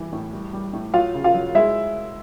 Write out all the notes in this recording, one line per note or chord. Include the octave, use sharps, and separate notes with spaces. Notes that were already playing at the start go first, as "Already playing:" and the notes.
Already playing: E3 G3
A2
G3
G3
A2
F#3 F4 F5
C#3
F4 F5
F#3
G#3 E4 E5